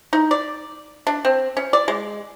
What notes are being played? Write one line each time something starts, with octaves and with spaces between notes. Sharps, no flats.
D#4
D5
D4
C4
C#4
D5
G#3